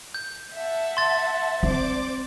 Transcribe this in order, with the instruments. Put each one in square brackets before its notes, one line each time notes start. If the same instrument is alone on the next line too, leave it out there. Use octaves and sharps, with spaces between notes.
[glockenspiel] G6
[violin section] E5 F#5 A5
[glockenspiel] C6 A6
[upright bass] C4 [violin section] C5 D5 D6